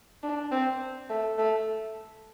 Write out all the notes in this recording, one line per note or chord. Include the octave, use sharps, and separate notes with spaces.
D4
C4
A3
A3